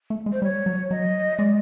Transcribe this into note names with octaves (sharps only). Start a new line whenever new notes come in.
A3
G#3
C5
G3 C#5
F#3
F#3 D#5
G#3 D5